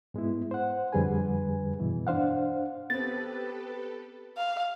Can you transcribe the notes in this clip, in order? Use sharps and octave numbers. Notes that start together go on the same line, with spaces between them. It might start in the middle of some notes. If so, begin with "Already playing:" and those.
G#2 G#3 B3 E4
C5 F#5
F2 D3 G3 G#4 B4 G#5
G2 B2 E3
D4 C5 F5 F#5
B3 C4 G4 A4 B4 A6
F5